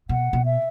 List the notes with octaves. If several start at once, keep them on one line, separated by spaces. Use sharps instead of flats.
B2 F#5
B2
E5